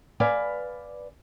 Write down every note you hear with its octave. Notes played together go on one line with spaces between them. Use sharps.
B4 D5 F5 G#5